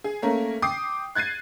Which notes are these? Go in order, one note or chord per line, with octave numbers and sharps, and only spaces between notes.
G#4
A3 A#3 C#4 A#4
G5 D6 D#6 C7
F#6 G#6 A6 C7 D#7